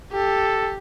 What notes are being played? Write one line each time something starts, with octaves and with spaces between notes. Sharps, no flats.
G4 A4